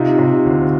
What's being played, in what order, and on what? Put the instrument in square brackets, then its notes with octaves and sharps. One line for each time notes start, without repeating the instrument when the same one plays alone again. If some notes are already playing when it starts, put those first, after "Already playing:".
Already playing: [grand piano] C3 [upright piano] D#4 F4
[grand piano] C3
D2